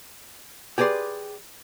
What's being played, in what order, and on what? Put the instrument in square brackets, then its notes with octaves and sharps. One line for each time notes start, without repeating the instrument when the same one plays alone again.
[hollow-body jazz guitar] G4 G#4 B4 D5 C6